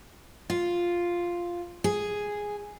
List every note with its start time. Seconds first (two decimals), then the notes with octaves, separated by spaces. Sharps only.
0.50 F4
1.84 G#4